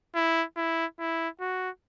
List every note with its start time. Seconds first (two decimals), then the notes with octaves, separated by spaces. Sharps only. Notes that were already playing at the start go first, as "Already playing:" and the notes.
0.15 E4
0.56 E4
0.99 E4
1.40 F#4